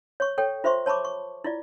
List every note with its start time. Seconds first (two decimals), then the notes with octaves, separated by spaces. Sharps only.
0.20 C#5 C#6
0.38 A4 C#5 G5
0.64 F4 C5 E5 C6 C#6
0.86 C#5 A5 B5 C#6 D6
1.05 C#6
1.44 E4 F4 D5